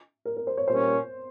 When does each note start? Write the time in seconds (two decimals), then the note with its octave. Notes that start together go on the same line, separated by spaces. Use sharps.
0.25 A#4
0.37 A#4
0.47 C5
0.57 C#5
0.68 A#2 G3 C#4 C5